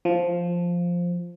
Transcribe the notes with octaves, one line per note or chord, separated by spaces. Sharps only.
F3